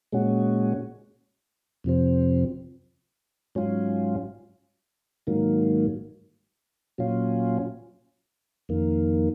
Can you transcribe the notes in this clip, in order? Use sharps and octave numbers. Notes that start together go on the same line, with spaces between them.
A#2 G#3 C#4 F#4
F2 C3 F3 C4
G#2 F#3 C#4 F4
G#2 D#3 F#3 A#3
A#2 F#3 C#4 F4
F2 D#3 A#3